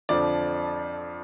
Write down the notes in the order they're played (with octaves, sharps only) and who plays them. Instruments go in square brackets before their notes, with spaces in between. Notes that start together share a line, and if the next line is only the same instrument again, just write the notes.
[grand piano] F2 D3 F3 D5